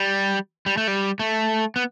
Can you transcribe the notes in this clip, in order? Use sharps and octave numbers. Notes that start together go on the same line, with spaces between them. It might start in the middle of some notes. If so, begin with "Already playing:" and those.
Already playing: G3
G3
A3
G3
A3
B3